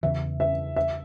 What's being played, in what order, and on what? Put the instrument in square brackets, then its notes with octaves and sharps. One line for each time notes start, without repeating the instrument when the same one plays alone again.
[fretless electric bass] E2 C#3 E3 [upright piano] E5
[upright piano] E5
E5